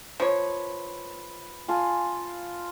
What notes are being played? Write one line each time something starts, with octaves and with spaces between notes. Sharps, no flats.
F3 B4 C#5
F4 G#5 A5